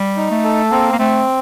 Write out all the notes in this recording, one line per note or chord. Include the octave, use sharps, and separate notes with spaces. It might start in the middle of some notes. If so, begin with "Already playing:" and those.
Already playing: G3
D#4
A3
A4
A#3 C4
A#3
A3 C4